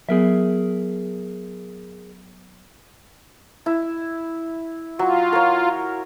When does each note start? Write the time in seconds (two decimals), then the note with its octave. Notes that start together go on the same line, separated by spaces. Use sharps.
0.09 F#3 B3 G#4 A#4 E5
3.66 E4
4.99 F#3 F4
5.33 A#4 C#5